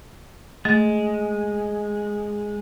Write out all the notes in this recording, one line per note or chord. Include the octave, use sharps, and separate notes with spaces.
G#3 A3